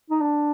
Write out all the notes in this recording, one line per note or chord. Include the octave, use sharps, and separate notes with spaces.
D#4
D4